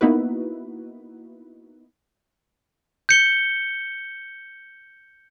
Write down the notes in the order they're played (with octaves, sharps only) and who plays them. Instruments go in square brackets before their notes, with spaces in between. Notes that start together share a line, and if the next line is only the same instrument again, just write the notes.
[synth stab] A#3 B3 D#4 E4 F#4 B4
[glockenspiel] G6 C#7 G7